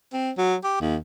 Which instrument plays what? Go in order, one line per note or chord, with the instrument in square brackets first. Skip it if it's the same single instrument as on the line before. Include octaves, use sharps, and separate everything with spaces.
[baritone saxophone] C4
F#3
G4
D#2